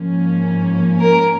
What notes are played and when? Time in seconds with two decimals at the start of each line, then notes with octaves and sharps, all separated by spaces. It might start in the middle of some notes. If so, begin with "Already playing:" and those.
Already playing: G#2 F3 A#3 C#4
1.00 A#4